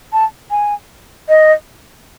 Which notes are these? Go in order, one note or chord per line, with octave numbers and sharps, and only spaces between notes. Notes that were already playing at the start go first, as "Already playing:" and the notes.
A5
G#5
D#5